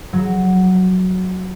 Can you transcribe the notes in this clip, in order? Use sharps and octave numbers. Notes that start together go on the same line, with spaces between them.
F#3